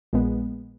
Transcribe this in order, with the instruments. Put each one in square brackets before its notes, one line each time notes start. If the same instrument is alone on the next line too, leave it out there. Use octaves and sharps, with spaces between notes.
[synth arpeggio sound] A#1 A#2 G#3 B3